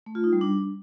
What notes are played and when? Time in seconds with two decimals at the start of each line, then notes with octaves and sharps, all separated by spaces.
0.06 A3
0.15 F4
0.24 D#4
0.33 G3
0.41 D4